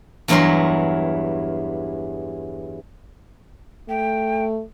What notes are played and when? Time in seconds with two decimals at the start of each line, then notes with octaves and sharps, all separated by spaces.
0.28 E2 G2 E3 F#3 A#4 C6
3.89 A3 G5